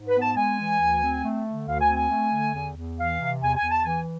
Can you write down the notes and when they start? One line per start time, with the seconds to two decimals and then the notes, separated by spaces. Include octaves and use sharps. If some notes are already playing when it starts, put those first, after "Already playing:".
Already playing: G#2
0.08 B4
0.15 B3
0.21 A5
0.36 G#3 G#5
0.59 E3
0.81 D2
1.02 C4
1.24 A3
1.46 D3
1.68 D2 F5
1.81 G#5
1.90 C4
1.97 G#5
2.10 A3
2.32 D3
2.54 E2
2.76 E2
2.98 E3 F5
3.20 C3
3.41 E2 G#5
3.57 G#5
3.63 E2
3.71 A5
3.85 E3 G#5